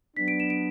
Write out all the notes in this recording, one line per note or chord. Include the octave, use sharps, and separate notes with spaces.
F#3 B3 D4 B6
D7
E7
D7